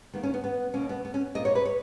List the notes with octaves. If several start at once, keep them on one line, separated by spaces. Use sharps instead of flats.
D#3 A#3 B3
C#4
B3
B3
B2 A#3 C#4
B3
B3
C#4
A#2 A#3 D#5
C#5
B4
C#5